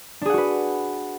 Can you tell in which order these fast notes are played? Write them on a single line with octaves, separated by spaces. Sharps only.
D4 G#4 F#5 F#4 B4